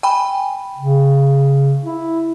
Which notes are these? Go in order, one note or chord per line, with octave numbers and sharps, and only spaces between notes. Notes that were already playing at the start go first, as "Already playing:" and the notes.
G5 G#5 B5
C#3
E4